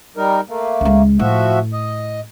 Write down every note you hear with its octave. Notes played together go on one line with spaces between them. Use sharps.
G3 D#4 A#4
A3 A#3
C#2 G#3
A2 F3 F#4 E5
D#5